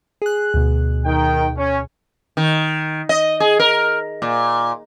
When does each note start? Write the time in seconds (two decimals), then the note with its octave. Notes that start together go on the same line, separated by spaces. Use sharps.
0.22 G#4 F#6
0.54 D2 B2
1.05 D#3 G5
1.57 C#4
2.37 D#3
3.09 D#5
3.40 G#4
3.59 A#4
4.22 A#2